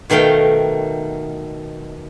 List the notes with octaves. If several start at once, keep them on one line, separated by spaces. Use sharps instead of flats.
B2 D#3 A3 F5 G5